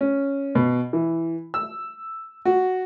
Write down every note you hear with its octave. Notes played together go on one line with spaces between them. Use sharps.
C#4
B2
E3
E6
F#4